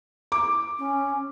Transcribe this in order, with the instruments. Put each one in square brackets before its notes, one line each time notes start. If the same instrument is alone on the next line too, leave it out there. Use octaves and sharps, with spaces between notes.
[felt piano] D6
[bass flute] C#4